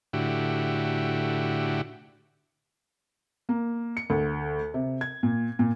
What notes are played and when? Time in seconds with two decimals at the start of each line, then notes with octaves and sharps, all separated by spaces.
0.13 A2 D3 E4 F#4 G4
3.49 A#3
3.97 C#7
4.10 D2
4.74 C3
5.01 G#6
5.23 A#2
5.59 A#2